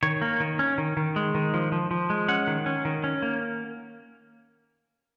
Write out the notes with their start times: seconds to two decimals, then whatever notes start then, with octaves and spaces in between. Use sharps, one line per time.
0.03 D#3 C#5
0.22 A#3
0.40 D#3
0.59 C#4
0.78 D#3
0.97 D#3
1.16 G#3
1.35 D#3
1.54 F3
1.72 F3
1.91 F3
2.10 G#3
2.28 C#4 F#5
2.47 D#3
2.66 C#4
2.85 D#3
3.04 C#4
3.22 A#3